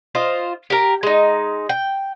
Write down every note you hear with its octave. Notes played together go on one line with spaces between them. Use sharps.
F4 C5 D#5
G4 A#4
G#3 D#4
G5